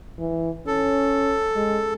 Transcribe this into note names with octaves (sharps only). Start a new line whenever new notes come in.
E3
C#4 A4
G#3